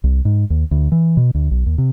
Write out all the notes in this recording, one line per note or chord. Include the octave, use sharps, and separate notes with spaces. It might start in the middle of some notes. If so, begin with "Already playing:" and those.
C2
G#2
D#2
D2
E3
B2
D2
B1
D#2
C3